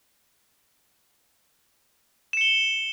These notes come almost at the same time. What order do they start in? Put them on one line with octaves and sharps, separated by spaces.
E7 C#7 G7